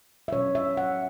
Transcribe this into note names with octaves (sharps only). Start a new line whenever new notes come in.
E5
B2 F#3 C#4 C#5
E5
F#5